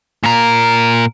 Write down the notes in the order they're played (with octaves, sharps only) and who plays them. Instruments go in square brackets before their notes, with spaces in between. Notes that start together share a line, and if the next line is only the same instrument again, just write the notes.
[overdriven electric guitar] A#2 A#4